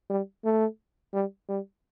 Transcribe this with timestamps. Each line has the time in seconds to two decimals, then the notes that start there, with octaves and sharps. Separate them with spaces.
0.10 G3
0.45 A3
1.14 G3
1.49 G3